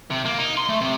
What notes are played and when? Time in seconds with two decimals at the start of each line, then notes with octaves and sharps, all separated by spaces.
0.11 C3
0.26 A#3
0.39 D#4
0.57 C6
0.69 A3
0.81 C3